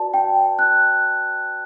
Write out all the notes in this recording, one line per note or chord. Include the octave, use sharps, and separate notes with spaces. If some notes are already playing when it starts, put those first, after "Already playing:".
Already playing: F#4 B4 D5 A5
G5
F#6